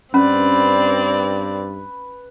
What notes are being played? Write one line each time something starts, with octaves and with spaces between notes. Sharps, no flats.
G2 C4 C#4 B4 D5